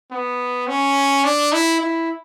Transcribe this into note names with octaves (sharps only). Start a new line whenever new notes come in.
B3
C#4
D4
E4
E4